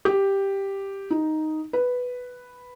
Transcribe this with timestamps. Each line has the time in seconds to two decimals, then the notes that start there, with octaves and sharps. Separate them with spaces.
0.05 G4
1.10 D#4
1.73 B4